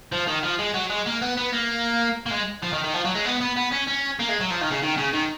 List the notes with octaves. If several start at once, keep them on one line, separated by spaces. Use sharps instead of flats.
F3
D#3
F3
G#3
F#3
G#3
A#3
B3
B3
A#3
A#3
G#3
F3
D#3
D#3
F3
F#3
G#3
B3
B3
B3
C#4
C#4
A#3
G#3
F#3
F3
D#3
C#3
D#3
C#3
D#3